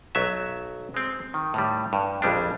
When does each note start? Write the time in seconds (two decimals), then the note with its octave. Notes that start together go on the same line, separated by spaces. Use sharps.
0.15 B1 F#3 E5
0.94 G#3 C4
1.34 D#3
1.54 A2 D#3 G3
1.93 G2
2.22 A#1 F2 G3 G#3 D4